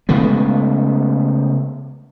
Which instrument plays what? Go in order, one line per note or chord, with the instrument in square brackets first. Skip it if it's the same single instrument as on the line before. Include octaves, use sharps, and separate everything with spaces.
[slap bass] C#3 G#3 A3 B3